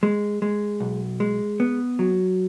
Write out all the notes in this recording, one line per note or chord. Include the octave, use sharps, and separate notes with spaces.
G#3
G#3
B1
G#3
B3
F#3